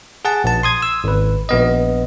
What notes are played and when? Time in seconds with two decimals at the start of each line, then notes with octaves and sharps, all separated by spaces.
0.25 G#4 F#5 A5
0.44 A#1 A5
0.63 C6 D#6 G#6
0.82 E6
1.04 G#1 B4
1.49 A#1 B3 D#5